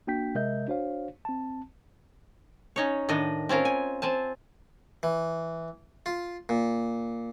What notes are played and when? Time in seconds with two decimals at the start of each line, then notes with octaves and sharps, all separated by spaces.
0.07 A#3 D4 F#4 G5 G6 B6
0.35 C3 G#3 A#4 D#5 E5 G6
0.68 D4 F#4 C5 C#5 F5
1.25 C4 A5
2.76 C#4 D#4 C#5
3.09 A2 D#3 D4 D#5
3.49 C4 C#4 F4 A#4
3.65 G#5
4.02 C4 G#5 A5
5.03 E3
6.06 F4
6.49 A#2